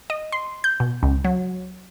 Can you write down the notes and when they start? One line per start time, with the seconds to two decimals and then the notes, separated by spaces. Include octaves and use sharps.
0.10 D#5
0.32 C6
0.64 G6
0.80 B2
1.03 C#2
1.24 F#3